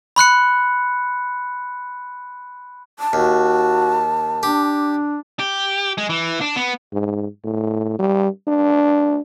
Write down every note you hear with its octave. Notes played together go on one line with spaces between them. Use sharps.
B5 C6 F#6 C#7
A5
D#2 F#4
D4 G4
G4
G#3
E3
D4
B3
G#2
A2
G3
D4